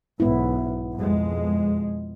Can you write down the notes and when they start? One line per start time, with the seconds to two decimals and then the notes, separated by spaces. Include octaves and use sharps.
0.20 B1 G#2 B3 E4
0.95 F2 B2 G#3